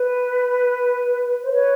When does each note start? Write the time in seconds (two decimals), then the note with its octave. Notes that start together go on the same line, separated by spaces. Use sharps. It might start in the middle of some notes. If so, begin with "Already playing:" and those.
Already playing: B4
1.44 C5
1.51 B4 C#5